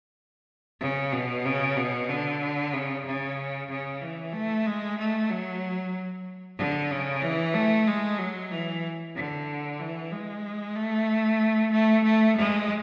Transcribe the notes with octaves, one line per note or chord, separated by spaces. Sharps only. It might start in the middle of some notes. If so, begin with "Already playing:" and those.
C#3
B2
C#3
B2
D3
C#3
C#3
C#3
E3
A3
G#3
A3
F#3
D3
C#3
E3
A3
G#3
F#3
E3
D3
E3
G#3
A3
A3
A3
G#3